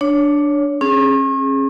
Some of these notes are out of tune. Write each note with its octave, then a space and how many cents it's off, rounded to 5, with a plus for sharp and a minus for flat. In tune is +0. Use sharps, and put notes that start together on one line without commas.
D4 +0 C#5 +15
C#4 -40 G#4 +0